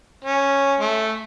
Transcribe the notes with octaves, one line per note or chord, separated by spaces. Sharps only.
C#4
A3